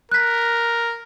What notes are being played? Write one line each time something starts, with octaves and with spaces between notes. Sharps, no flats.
A#4 F#6 B6